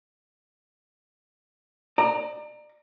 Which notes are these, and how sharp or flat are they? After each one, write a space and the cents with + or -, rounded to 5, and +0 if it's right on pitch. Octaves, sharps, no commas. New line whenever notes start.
D5 +30 A#5 +0